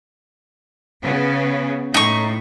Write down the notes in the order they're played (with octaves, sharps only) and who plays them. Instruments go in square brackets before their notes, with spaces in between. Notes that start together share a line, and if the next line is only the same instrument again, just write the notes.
[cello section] C#3 B3
[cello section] A2 [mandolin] D#4 C#6